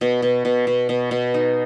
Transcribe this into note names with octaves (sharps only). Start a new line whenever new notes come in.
B2
B2
B2
B2
B2
B2
D#4